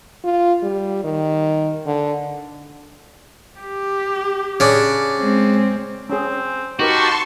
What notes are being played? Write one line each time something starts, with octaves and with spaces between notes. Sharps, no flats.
F4
G3
D#3
D3
G4
C#3 D4
G#3 C4
C4 C#4 G#4
D#4 F#4 G4 A#4 B4 A5 C6 C#6